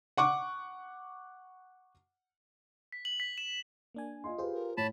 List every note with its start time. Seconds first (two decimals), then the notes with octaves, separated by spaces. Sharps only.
0.17 F#5 C#6 D6
2.92 B6
3.05 F#7
3.20 B6
3.38 E7
3.94 A#3 D4 G#5
4.24 F4 D#5 C6
4.38 F4 G4 G#4 B4 C5
4.54 A#4
4.77 A2 C#5 A5 B5